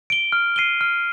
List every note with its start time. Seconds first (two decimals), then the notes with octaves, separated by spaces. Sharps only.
0.10 D7 G7
0.32 F6
0.56 C7 D#7 G7
0.81 F6